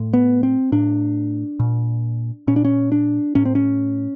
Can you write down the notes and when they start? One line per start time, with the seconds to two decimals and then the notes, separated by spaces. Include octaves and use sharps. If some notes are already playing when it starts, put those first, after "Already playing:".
Already playing: A2
0.13 B3
0.43 C4
0.72 A2 D4
1.60 A#2
2.47 A#2 C#4
2.56 D4
2.65 C#4
2.92 D4
3.35 A2 C#4
3.45 C4
3.55 C#4